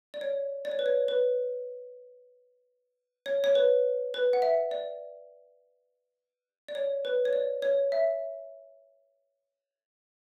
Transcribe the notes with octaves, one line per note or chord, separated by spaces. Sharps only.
D5
C#5
D5
C#5
B4
C#5
B4
C#5
C#5
B4
B4
F#5
E5
D5
D5
C#5
B4
C#5
D5
C#5
E5